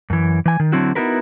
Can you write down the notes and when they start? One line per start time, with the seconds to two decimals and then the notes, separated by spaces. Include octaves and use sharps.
0.10 F#2 E3
0.46 E3 G#5
0.60 D#3
0.72 D3 F#3 C4 E4 F#4
0.95 B3 D#4 E4 F#4 A#4 B4